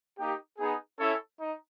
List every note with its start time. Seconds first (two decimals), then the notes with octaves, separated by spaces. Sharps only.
0.18 A#3 D#4 G4
0.58 B3 D#4 G#4
0.98 C#4 E4 A4 C#5 E5
1.38 D#4